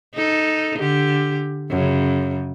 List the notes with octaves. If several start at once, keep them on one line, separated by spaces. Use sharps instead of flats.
D#4 A4
D3 G4
F#2 C#3